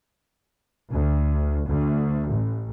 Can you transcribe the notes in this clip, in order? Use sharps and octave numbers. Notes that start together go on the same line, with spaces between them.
D2
D2
A1